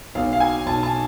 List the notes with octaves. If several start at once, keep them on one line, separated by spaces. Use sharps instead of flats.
B1 B2 F5
F5
G#5
B1 B2 A5
A5